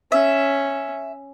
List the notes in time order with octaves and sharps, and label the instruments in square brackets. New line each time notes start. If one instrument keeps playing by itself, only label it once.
[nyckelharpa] C#4 [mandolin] E5